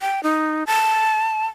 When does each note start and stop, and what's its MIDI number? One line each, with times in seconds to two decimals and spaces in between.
0.01 0.23 79
0.23 0.64 63
0.67 1.46 81